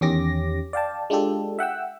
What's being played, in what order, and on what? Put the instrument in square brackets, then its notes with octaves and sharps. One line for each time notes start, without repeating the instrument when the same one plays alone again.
[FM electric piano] E2 D#3 C#4 G4 D6 A#6
D5 F5 G5 A5
G#3 D4 F4 G4 A4
E5 F#5 G5 E6